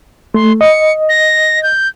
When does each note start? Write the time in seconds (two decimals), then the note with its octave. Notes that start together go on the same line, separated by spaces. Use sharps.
0.34 A3 C6
0.61 D#5 C#7
1.09 A#6
1.63 G6